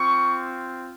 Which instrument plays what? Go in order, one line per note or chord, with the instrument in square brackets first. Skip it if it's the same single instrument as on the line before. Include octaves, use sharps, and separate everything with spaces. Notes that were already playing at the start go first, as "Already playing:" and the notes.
Already playing: [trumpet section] C4 F4 C#6